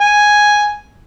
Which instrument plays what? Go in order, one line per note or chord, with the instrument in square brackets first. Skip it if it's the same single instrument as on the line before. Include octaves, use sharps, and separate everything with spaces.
[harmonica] G#5